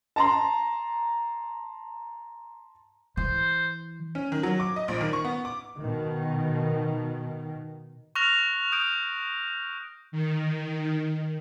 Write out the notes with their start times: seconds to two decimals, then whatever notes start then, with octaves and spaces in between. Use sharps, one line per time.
0.16 A5 A#5 C6
3.17 E3 C5
4.15 C#4
4.32 D#3
4.43 F#3
4.60 D6
4.76 D#5
4.88 A#1
5.01 D#3
5.13 C#6
5.25 B3
5.45 D6
5.78 B2 D#3
8.15 C#6 F6 F#6 A#6 F7
8.72 D#6 G6 D7
10.12 D#3